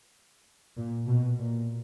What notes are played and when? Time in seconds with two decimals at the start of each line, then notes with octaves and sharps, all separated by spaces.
0.76 A#2
1.07 B2
1.39 A#2